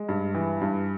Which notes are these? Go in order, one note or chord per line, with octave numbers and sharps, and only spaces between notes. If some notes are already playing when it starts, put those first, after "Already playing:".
Already playing: G#3
G2
E3
G2